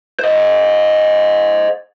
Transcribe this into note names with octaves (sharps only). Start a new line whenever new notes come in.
C5 D#5